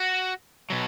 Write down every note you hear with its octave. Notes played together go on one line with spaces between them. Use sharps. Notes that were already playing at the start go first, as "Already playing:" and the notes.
Already playing: F#4
B2 F#3